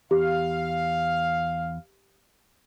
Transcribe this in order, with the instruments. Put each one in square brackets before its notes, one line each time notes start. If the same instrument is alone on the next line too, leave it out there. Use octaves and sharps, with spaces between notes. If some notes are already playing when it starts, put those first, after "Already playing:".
[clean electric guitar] E2 [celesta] G4 [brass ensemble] F5